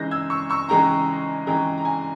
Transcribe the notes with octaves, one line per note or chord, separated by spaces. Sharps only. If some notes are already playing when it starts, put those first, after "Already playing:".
Already playing: C#3 E3 G#3 D#4 G6 A#6
E6 G#6
C#6 E6
C#6 E6
C#3 E3 G#3 D#4 G5 A#5
C#3 E3 G#3 D#4 G5 A#5
A#5
G#5